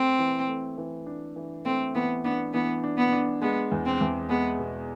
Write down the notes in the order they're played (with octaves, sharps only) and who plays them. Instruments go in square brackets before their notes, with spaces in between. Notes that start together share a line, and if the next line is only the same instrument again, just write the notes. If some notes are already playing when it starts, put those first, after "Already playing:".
Already playing: [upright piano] A3 [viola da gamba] C4
[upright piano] E3
A3
E3
D4
E3
[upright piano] A3 [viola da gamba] C4
[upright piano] E3 [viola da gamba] B3
[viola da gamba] B3 [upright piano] D4
[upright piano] E3 [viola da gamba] B3
[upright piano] D4
[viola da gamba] B3
[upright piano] D4
[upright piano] G#3 [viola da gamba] B3
[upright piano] E2
[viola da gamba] C4
[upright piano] E2
[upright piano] G#3 [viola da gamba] B3
[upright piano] B2